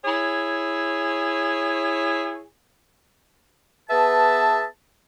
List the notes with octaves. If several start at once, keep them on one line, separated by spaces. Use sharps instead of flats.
E4 G#4 C#5
B3 G#4 B4 E5 A5